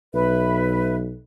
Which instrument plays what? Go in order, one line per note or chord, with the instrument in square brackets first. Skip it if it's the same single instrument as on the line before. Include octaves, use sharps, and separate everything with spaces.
[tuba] B1 [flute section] B4 E5